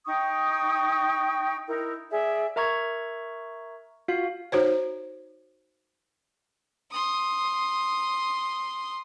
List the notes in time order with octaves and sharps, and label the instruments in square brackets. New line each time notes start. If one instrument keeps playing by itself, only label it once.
[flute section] D#4 G5 C#6 D#6
D#4 E4 A#4
G#4 D5 E5
[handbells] A#4 E5 A#5 C#6 G#6
F4 F#4 F5
[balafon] D#4 F#4 C5 C#5
[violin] C6 D#6